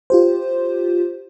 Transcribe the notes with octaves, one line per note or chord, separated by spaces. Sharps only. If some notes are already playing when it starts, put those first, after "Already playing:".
F4 G4 C5